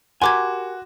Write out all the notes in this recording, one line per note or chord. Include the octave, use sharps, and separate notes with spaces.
F#4 G4 A#4 G#5 C6 D6 G#6